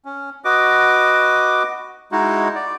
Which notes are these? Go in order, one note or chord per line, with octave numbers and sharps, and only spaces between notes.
C#4
F#4 B4 D#5 D6
G#3 D#4 E4 F#4
D5